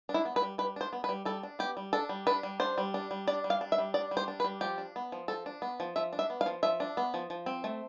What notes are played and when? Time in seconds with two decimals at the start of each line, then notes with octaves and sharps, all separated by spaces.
0.09 D4
0.14 E4
0.25 B3
0.36 B4
0.42 G3
0.58 G3 B4
0.76 D4 C5
0.93 B3
1.04 B4
1.09 G3
1.25 G3 A4
1.43 D4
1.59 B3 G4
1.77 G3
1.93 D4 A4
2.09 G3
2.27 D4 B4
2.43 G3
2.60 D4 C5
2.78 G3
2.94 D4
3.11 G3
3.27 D4 D5
3.44 G3
3.50 F5
3.61 D4
3.72 E5
3.78 G3
3.94 D4 D5
4.11 G3
4.17 C5
4.28 D4
4.40 B4
4.44 G3
4.61 F3 G4
4.78 D4
4.96 B3
5.12 F3
5.28 F3 A4
5.46 D4
5.62 B3
5.80 F3
5.96 F3 E5
6.13 D4
6.19 E5
6.30 B3
6.41 F5
6.46 F3
6.63 F3 E5
6.80 D4
6.97 B3
7.14 F3
7.30 F3
7.46 C4
7.64 A3